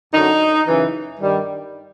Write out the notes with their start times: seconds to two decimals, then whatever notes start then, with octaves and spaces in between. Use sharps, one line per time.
0.12 F#2 D3 F#3 D#4
0.65 F#2 C#3 E3
1.19 G2 D#3 G3